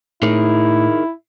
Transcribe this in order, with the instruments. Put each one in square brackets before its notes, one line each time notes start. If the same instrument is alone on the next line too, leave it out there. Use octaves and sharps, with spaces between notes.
[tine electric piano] A2 [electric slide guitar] D#4 G#4 A#4 [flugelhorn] E4